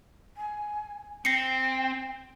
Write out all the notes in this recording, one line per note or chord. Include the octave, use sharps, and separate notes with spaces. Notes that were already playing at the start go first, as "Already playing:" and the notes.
G#5
C4 G5 A#6 C7 C#7